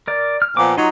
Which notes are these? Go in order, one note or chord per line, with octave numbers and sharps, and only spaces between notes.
A#4 D5
F6
A#2 F3 B3 D6
F#3 D#4 F4